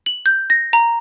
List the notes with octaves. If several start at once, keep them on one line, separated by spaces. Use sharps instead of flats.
F#7
G6
A#6
A#5